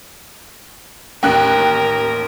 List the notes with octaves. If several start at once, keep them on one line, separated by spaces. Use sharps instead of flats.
A1 D#2 A#4 G5 F#6